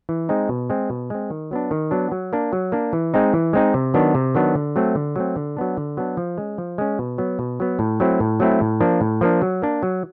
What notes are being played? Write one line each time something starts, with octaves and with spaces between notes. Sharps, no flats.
E3
G#3 C4 D#4
B2
G#3 C4
B2
G#3 C4
D#3
F#3 B3 D4
D#3
F#3 B3 D4
F#3
A#3 D4
F#3
A#3 D4
E3
G#3 C4 D#4
E3
G#3 C4 D#4
C3
D#3 F#3 B3 D4
C3
D#3 F#3 B3 D4
D3
F#3 A3 C4
D3
F#3 A3 C4
D3
F#3 B3 D4
D3
F#3 B3 D4
F3
G#3 C#4
F3
G#3 C#4
B2
F#3 B3
B2
F#3 B3
A2
F#3 A3 C4 E4
A2
F#3 A3 C4 E4
A2
F3 A#3 D4
A2
F3 A#3 D4
F#3
A#3 D4
F#3